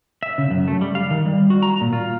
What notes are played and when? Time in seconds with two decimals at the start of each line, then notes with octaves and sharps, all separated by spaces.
0.23 E5
0.38 C#3
0.51 F#2
0.68 A3
0.81 G3
0.95 F5
1.10 D#3
1.26 G3
1.50 F#4
1.62 A#5
1.81 A#2
1.93 F4